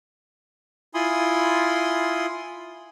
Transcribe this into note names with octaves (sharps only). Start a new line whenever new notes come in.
E4 F4 G#5 B5 C6 D#6